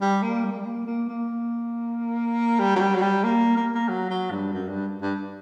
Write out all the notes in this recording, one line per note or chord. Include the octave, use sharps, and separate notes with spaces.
G3
A#3
G3
A#3
G3
A#3
A#3
A#3
G3
F#3
G3
F#3
G3
A#3
A#3
A#3
F#3
F#3
G2
F#2
G2
G2